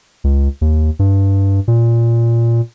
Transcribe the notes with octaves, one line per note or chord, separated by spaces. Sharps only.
C#2
D#2
G2
A#2